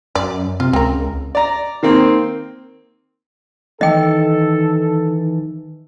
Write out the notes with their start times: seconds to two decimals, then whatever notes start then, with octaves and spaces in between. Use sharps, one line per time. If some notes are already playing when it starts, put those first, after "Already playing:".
0.15 F#2 D5
0.60 C3 F4
0.73 C#2 C4 A#4
1.35 D5 A#5
1.83 D#3 A#3 C4
3.81 D#3 E3 A4 D#5 G5